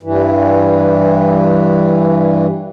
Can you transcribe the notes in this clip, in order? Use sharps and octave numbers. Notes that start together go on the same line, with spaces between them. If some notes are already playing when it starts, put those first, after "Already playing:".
G2 E3